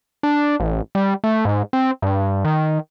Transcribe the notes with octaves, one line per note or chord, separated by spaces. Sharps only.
D4
A1
G3
A3
G#2
C4
G2
D#3